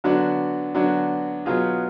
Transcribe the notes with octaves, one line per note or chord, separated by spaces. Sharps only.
D3 F#3 B3 D4 F#4
D3 F#3 B3 D4 F#4
B2 F#3 B3 F4 G#4